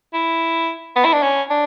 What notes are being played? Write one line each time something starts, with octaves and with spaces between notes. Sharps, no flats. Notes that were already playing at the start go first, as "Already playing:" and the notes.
E4
B3
E4
D4
C#4
D4